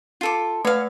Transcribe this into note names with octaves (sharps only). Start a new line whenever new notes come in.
F4 A4 D6
A3 B4 C#5 F5 F#5